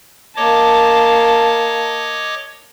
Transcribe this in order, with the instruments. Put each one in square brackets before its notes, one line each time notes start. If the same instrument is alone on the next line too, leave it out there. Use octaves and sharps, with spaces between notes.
[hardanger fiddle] A#3 A5 [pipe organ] C#5 D#5 D6